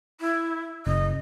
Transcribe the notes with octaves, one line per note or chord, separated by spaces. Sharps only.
E4
F#1 D#5